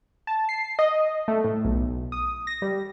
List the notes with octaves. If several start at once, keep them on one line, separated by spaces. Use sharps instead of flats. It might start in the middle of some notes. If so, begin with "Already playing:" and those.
A5
C7
D#5
A3
A2
B1
D#6
A#6
G3